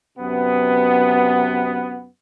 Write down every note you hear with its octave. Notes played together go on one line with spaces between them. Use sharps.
F#2 C3 B3